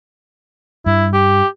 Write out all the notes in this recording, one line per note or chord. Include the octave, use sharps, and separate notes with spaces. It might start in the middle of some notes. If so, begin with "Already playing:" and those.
G2 E4
G4